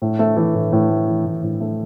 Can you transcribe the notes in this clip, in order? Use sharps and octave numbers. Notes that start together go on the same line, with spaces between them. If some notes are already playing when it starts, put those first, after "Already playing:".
A2
A3
E3
A2
A2
A3
E3
A2
A2
A3